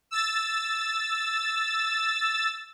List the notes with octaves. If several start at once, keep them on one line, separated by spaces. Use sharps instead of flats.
E6 A6